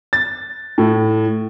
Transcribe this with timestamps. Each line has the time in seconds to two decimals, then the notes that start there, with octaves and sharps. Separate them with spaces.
0.13 A6
0.78 A2